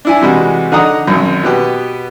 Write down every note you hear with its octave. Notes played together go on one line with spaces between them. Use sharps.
D4 E4 G#5
C3 E3 G3 G#3 F#4
D3 D#4 F#5 A#5 D#6
G#1 F#2
B2 B3 G4